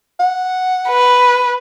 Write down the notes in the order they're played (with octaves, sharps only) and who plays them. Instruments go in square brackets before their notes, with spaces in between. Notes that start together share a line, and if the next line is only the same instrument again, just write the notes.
[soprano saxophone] F#5
[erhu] B4